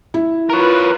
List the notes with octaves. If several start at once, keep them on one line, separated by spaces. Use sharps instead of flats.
E4
F4 A#4 B4 C#5